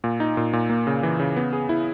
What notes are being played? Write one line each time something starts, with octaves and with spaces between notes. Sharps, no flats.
A#2
D#4
A#2
A#2
A#3
C#3
E3
C#3
B3
G#4
E4